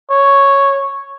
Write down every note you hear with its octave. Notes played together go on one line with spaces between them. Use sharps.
C#5